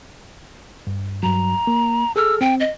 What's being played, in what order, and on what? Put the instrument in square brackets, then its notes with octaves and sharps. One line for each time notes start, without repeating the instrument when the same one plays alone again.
[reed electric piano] G2
[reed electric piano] G2 F#3 [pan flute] A#5
[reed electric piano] A#3
[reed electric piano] G#4 A4 F6 [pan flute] E6
[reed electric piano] C4 [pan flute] G5
[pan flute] D#5